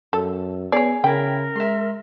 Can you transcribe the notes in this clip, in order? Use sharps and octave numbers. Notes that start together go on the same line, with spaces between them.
F#2 A4
B3 G#4 C#5 D5
C#3 E4 A#4 G5 B5
G#3 E5 C6